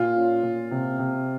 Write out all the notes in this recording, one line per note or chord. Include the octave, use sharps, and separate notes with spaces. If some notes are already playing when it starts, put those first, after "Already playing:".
Already playing: A#2 F4
C#4
A#2
C3
C3